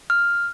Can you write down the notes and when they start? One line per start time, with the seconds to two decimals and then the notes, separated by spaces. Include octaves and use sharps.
0.10 F6